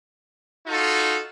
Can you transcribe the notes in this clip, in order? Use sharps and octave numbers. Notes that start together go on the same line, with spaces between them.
D#4 F4 F#4 A4